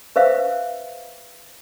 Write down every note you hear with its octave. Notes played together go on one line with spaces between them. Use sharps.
B4 C5 E5 F5